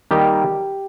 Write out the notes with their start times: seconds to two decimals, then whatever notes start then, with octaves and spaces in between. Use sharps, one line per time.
0.11 D#3 G3 A#3 G4